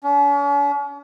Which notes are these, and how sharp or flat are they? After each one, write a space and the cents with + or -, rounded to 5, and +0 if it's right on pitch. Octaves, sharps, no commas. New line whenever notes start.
C#4 +45